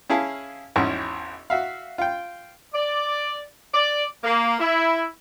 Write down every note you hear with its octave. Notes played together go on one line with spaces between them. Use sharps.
C#4 E4 G#4 F5 A5
G#1 E2 C#4
F#4 E5 F5
F4 G5
D5
D5
A#3
E4